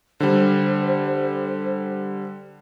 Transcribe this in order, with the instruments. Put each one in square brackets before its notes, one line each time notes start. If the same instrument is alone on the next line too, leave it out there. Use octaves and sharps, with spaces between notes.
[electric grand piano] D3 G3 [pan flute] C5